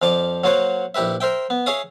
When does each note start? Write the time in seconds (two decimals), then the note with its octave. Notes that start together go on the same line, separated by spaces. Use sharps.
0.02 F2 F3 D5 D6
0.44 F#3 A#3 C5 C#5 F#5
0.95 A#1 E4 G4 B4 E5
1.21 A#4 C5 E5 G5
1.50 B3
1.66 G#4 C#5 E5 F5 D#6